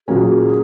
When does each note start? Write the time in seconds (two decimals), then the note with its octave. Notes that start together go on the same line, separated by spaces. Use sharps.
0.08 A#2 F#3 A#3 C#4 G#4